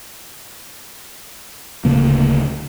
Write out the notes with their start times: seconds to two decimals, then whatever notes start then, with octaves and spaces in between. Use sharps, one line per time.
1.85 D1 D2 C#3 A#3